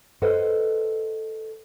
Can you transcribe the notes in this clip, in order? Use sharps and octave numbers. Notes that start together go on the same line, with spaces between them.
A4 B4 C5 D#5 F#5